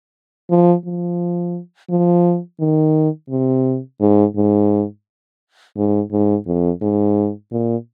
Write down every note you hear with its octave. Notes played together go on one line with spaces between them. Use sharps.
F3
F3
F3
D#3
C3
G#2
G#2
G#2
G#2
F2
G#2
A#2